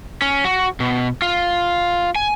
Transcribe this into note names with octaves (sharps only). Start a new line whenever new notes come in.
C#4
F#4
B2
F4
G#5